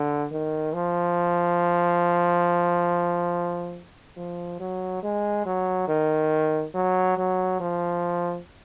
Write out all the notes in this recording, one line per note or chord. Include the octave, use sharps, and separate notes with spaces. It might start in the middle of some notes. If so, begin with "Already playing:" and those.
Already playing: D3
D#3
F3
F3
F#3
G#3
F#3
D#3
F#3
F#3
F3